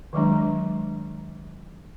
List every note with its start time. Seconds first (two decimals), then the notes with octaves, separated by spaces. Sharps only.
0.13 D#3 F#3 G#3 D4